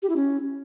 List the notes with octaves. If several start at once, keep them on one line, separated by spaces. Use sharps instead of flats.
G4
E4
C#4